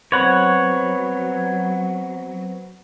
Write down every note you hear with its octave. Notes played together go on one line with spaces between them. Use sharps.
F#3 B3 C4 B4 C#5 F#5